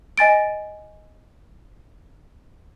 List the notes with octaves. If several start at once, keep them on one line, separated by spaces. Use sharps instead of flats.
D#5 G#5 A6 D7